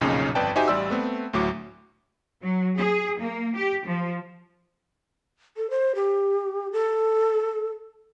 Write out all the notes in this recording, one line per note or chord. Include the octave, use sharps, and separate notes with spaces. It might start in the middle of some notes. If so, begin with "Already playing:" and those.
B1 F2 A#2 C#3 C#4 D#4
G1 F2 B4 D5 G5 A5
D#4 F#4 G4 C5 E5 G#5
A1 G3 D5 C6 E6
A3 B3 C4
D2 A2 F#3 D6
F#3
G#4
A#3
G4
F3
A4
C5
G4
A4